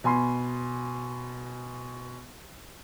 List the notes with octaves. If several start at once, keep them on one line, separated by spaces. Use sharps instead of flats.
B2 G#5 B5 C6